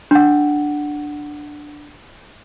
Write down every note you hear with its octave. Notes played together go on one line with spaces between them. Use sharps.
D4 F#5